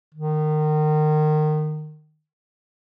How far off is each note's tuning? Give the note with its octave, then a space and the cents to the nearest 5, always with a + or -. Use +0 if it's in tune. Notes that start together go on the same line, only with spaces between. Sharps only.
D#3 -25